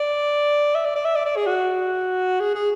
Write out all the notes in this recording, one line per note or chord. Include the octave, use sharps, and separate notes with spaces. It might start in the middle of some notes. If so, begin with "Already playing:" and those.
Already playing: D5
E5
D5
D5
E5
D5
D5
G#4
F#4
G#4
G#4